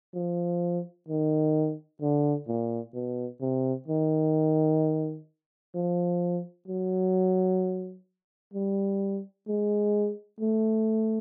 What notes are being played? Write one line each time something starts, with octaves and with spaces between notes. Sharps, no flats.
F3
D#3
D3
A#2
B2
C3
D#3
F3
F#3
G3
G#3
A3